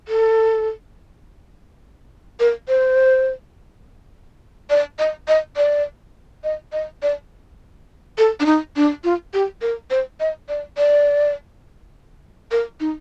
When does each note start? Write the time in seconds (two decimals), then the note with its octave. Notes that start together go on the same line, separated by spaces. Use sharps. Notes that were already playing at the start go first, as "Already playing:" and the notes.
0.08 A4
2.40 A#4
2.68 C5
4.70 D5
4.99 D#5
5.28 D#5
5.57 D5
6.44 D#5
6.72 D#5
7.03 D5
8.18 A4
8.40 D4
8.46 D#4
8.76 D4
9.04 F4
9.34 G4
9.62 A#4
9.91 C5
10.20 D#5
10.49 D5
10.78 D5
12.51 A#4
12.80 D#4